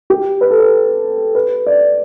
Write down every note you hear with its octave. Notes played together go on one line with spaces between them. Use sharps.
G4
B4
A4
B4
B4
D5